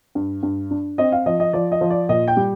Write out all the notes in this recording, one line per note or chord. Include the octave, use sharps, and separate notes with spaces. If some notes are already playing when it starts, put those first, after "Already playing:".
G2
G2
D4
C4 D#5
F5
F3 D#5
D#5
F3 D5
D#5
F3
D5
A#2 D#5
G5
G3